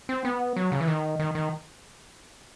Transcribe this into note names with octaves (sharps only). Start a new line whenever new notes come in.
C4
B3
F#3
C#3
E3
D#3
D#3
D#3